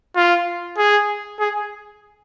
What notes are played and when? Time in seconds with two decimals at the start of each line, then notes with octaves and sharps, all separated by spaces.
0.16 F4
0.78 G#4
1.40 G#4